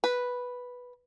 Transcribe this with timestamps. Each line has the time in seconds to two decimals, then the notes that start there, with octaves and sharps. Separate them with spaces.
0.04 B4